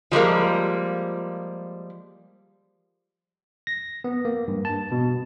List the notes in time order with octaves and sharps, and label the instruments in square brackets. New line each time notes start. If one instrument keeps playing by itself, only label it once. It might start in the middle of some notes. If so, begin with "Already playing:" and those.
[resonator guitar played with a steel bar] F3 G3 G#3 A#3
[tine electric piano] A#6
B3
A#3
G2
A5
B2